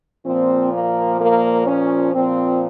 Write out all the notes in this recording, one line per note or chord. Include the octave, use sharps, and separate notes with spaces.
A#2 F3 C4
A#3
A#3
C#4
A#2 F3 C4